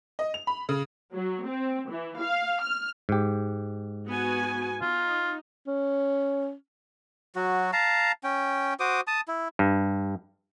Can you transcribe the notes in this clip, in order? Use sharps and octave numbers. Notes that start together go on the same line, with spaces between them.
D#5
F7
B5
C#3
F#3
C4
E3
F5
F6
G#2 G4
B3 F#4 G#5
D#4 F4
C#4
F#3 F#4
F5 A5 A#5
C#4 G5
F#4 C5 D6 D#6
A5 D#6
E4
G2